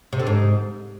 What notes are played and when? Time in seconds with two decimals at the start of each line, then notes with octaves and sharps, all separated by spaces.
0.13 C3
0.20 D3
0.27 G#2